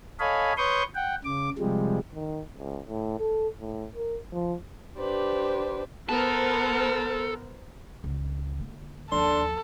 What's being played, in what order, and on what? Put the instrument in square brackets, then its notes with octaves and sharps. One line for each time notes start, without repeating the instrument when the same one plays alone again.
[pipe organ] A4 C#5 D#5 F5 G#5 B5
B4 C#5 C6 C#6 D#6 G6
F#5 G5
C#3 D6
C3 F3 G3 G#3
[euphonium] D#3
C#2
A2
A4
A2
A#4
F3
[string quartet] D4 G4 B4 C5
[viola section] B3 A#4 C5 [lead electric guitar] A4
[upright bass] C#2
D3 A#3
[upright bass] D#2 F3 [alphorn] D4 [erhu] A4 [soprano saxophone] C6